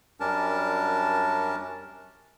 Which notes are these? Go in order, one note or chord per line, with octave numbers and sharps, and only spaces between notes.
F#2 G3 C#4 D4 A#4 A5